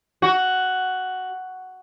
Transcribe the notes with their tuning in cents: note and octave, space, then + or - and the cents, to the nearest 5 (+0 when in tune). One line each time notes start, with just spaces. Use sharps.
F#4 +5